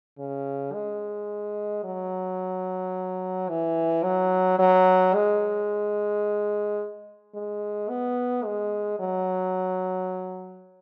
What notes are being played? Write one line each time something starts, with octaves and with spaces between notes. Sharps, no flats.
C#3
G#3
F#3
E3
F#3
F#3
G#3
G#3
B3
G#3
F#3